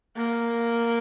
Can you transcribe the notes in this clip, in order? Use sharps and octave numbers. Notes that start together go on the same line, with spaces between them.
A#3